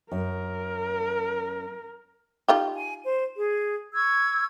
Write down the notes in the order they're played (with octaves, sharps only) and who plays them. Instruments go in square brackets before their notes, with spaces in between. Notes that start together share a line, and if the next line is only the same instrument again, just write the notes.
[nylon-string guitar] F#2 [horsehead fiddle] A#4
[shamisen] D#4 F4 G4
[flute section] G#5
C5
G#4
C#6 E6 G#6